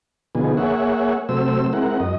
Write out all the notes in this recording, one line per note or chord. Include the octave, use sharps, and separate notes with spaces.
B2 D3 F3 B3 D#4 G#4
A#3 G#4 C#5 E5 F#5
C3 F#3 A3 C5 E6
G#3 C4 E4 A#4 F#5
F#2 D#5